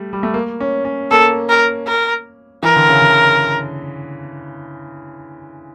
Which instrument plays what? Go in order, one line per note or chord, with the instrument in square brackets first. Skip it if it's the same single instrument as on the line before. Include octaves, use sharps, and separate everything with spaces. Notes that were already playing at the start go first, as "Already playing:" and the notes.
Already playing: [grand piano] G3 A3
G3
A3
A#3
C#4
C#4
[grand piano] A#3 [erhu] A4
[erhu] A#4
A#4
[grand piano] E3 [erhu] A#4
[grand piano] D3
C#3
D3